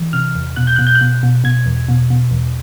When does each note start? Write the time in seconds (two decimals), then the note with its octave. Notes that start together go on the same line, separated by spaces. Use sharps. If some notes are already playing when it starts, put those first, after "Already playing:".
Already playing: E3
0.13 C3 F6
0.35 E2
0.56 B2 F#6
0.67 G6
0.76 B2 F#6
0.87 G6
0.95 F#6
1.01 B2
1.23 B2
1.44 B2 G#6
1.66 E2
1.88 B2
2.10 B2
2.31 E2